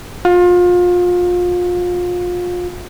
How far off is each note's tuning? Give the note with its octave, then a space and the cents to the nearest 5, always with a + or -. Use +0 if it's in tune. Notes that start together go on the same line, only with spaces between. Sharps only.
F4 +30